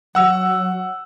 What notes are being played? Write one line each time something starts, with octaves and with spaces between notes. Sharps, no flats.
F#3 F#5 E6